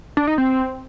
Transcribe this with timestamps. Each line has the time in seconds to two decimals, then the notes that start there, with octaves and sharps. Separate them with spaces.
0.17 D4
0.27 D#4
0.38 C4